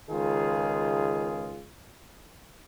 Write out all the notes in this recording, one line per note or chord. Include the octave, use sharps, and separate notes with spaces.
C#2 D#3 F4 G#4